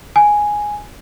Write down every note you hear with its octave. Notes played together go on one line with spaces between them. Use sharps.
G#5